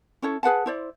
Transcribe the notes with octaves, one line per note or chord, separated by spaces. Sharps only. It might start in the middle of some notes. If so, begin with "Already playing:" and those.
C#4 E4 A4 C#5
G#4 B4 F#5 A5
E4 C5 D5